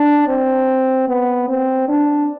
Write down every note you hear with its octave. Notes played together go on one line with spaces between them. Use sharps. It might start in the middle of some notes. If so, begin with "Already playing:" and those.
Already playing: D4
C4
B3
C4
D4